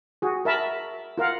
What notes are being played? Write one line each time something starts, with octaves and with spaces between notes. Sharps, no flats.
F#4 G#4
A#4 E5 A5 B5
F4 A#4 F5 F#5